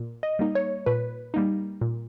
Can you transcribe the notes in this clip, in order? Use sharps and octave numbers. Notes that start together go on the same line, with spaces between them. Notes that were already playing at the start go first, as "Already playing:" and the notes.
Already playing: A#2
D#5
G3 A#3 D#4
C#5
A#2 B4
G3 A#3 D#4
A#2